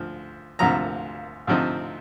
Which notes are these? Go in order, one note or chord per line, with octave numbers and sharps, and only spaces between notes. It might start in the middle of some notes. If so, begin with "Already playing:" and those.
Already playing: D2 F3
D2 C3 F3 A#5
D2 C3 F3 C4 D#4